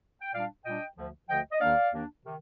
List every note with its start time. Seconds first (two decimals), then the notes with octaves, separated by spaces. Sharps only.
0.21 G5
0.34 A#2 G3 D4 D5 F5
0.65 A#2 G3 D4 D#5 G5
0.97 D2 D3 F3
1.29 D2 D3 F3 D#5 G5
1.52 D#5
1.60 D#2 D#3 A#3 D4 D5 F5
1.92 D#2 D#3 A#3 D4
2.25 C3 D#3